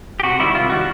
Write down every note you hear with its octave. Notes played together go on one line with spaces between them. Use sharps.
G4
C3 F#4
D#3 G3 E4
C3 F4
D#3 G3 F#4